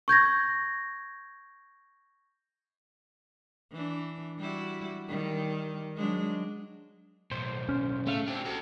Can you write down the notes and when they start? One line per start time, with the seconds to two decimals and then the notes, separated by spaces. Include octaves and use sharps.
0.08 C#6 G6 G#6 A#6
3.71 E3 D4
4.39 G3 E4 F#4
5.09 D#3 G3
5.96 F#3 G#3 D4
7.31 B1 A2 C5
7.69 C#4
8.07 C#3 A3 F5
8.27 C4 D4 G4
8.45 F#4 A4